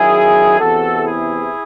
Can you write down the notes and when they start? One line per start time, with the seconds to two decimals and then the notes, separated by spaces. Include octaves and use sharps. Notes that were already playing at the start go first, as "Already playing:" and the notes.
Already playing: F#2 D#3 F#3 E4 G#4
0.60 E2 C3 E3 F#4 A4
1.06 E4 G#4